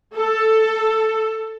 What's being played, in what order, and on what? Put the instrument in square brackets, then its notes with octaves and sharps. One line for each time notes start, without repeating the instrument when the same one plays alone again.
[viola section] A4